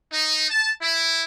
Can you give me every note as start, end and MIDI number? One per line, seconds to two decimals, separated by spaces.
0.12 0.46 63
0.50 0.70 81
0.82 1.24 64